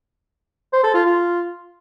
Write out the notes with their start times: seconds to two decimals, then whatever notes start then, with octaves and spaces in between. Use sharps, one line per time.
0.73 C5
0.83 A4
0.94 F4
1.05 F4